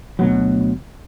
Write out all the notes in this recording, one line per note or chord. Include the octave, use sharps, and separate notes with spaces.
D2 B2 F#3